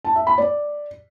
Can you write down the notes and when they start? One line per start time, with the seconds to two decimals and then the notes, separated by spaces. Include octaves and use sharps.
0.05 A5
0.16 E5
0.27 B5
0.38 D5